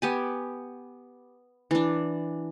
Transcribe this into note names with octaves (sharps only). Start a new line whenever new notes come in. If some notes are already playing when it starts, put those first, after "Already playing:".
B3 G4 G#5
E3 D4